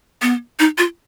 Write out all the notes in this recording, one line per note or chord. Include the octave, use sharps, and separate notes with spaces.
B3
D#4
F4